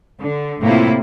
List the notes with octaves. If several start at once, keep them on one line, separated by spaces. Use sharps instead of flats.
D3
A2 C3 A#3 E4 F4